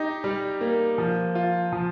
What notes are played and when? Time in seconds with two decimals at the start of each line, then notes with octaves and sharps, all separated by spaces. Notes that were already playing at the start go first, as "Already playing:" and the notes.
Already playing: D#4 G4
0.24 G3
0.61 A#3
0.98 F3
1.35 F4
1.72 F3